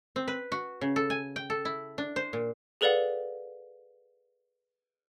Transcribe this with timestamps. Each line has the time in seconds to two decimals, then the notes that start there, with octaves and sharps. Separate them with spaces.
0.16 C4
0.28 B4
0.52 F#4
0.81 C#3
0.96 A4
1.10 G#5
1.36 G5
1.50 A4
1.65 E4
1.98 D4
2.16 C5
2.33 A#2
2.81 G#4 A4 B4 D5 F5 F#5